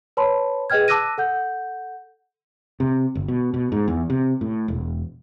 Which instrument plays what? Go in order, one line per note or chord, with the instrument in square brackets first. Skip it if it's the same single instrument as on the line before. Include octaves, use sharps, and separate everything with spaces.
[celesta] B4 C#5 A5 B5 C6
G#4 B4 D#5 G5 F6 G#6
A5 D6 E6 F#6 A#6 D#7
A4 F#5 G6
[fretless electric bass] C3
G1
B2
B2
G#2
E2
C3
A2
E1